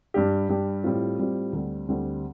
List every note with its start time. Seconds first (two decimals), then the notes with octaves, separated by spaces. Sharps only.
0.14 G2 G3 D4 G4
0.49 G2 G3 D4 G4
0.84 A2 G3 C4 F4
1.19 A2 G3 C4 F4
1.53 D2 D3 G3 C4
1.89 D2 D3 G3 C4